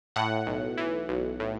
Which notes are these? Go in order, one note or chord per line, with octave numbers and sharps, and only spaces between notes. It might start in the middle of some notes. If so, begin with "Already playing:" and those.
A2 F#5
B1
E3
B1
A2